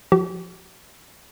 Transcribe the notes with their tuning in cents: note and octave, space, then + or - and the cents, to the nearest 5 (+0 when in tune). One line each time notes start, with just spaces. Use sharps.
F3 +10 G4 -45